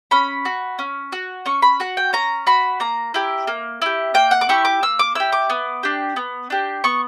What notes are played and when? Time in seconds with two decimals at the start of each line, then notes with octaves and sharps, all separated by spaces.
0.11 C#4 B5
0.45 F#4
0.79 C#4
1.12 F#4
1.46 C#4 C#6
1.62 B5
1.80 F#4 F#5
1.97 G5
2.13 C#4 A#5
2.47 F#4 B5
2.80 A#3 A#5
3.14 E4 G4
3.47 A#3
3.82 E4 G4
4.14 A#3 G5
4.31 F#5
4.41 D6
4.49 E4 G4 C#6
4.65 D6
4.83 A#3 E6
4.99 D6
5.15 E4 G4 E6
5.32 D6
5.50 B3
5.83 D4 G4
6.16 B3
6.50 D4 G4
6.84 B3 C#6